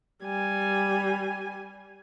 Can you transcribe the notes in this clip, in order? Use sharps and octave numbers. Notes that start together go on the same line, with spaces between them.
G3 G#5